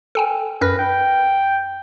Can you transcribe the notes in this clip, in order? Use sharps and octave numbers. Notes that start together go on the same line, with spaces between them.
A4 G5 G#5
F#2 B4 F6 A#6
G5